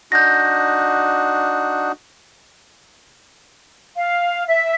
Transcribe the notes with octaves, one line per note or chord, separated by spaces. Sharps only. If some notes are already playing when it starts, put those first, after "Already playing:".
D4 D#4 F#4 G6 A#6
F5
E5